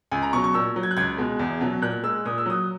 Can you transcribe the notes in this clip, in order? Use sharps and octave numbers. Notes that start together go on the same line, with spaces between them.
C#2 G#5
A#5
B2 F#3 C#6
C#6
A#2 E6
F#3
G#6
F#6
C#2 G#6
B2 G#3
E2
B2 F#3
A#2 F#6
G#3 E6
A#2 D#6
E6
F#3 D#6